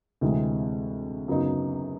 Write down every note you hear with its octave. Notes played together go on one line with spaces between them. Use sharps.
D2 C3 E3 G#3
F#2 C#3 F#3 B3 D#4